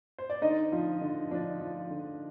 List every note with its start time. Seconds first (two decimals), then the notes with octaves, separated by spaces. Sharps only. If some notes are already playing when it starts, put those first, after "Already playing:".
0.18 C5
0.30 D5
0.41 D3 D#4 D#5
0.72 F3
1.01 D3
1.31 F3 D4 D5
1.61 F3
1.91 D3